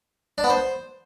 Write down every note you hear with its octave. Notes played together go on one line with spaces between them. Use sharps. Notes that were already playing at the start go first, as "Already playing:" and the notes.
D4
B3
C5